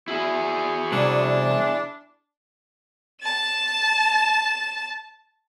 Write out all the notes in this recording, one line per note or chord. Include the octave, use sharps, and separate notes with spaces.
E4 F#4 G#4
C2 D4
A5 E7